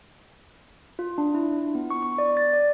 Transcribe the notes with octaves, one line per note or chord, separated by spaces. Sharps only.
F4
D4
E4
B3
C#6
C#6
D5
A6
D5